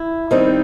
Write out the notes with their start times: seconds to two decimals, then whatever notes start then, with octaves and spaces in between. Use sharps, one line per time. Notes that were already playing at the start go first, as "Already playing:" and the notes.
Already playing: E4
0.31 D#3 G3 C4 D#4